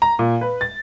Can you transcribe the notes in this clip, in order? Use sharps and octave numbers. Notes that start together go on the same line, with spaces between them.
A#5
A#2
B4
A6